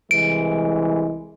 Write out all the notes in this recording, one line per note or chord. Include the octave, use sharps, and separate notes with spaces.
C2 E3 G#3 D7